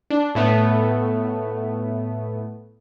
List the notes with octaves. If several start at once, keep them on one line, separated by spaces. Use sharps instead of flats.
D4
A2 A3 B3